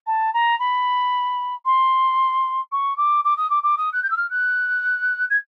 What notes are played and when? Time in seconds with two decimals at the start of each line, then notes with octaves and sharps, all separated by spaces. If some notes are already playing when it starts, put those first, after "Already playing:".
0.06 A5
0.33 A#5
0.59 B5
1.65 C6
2.72 C#6
2.97 D6
3.24 D6
3.37 D#6
3.50 D6
3.63 D6
3.77 D#6
3.92 F#6
4.03 G6
4.10 E6
4.16 F6
4.30 F#6
5.30 G#6